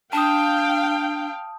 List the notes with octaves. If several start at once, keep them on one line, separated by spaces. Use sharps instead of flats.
D4 F5 G5 A5 D#6